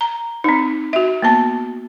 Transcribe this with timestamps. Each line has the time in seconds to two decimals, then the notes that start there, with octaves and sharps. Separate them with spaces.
0.01 A#5
0.44 C4 D#4
0.93 F#4 E5
1.22 A#3 B3 A5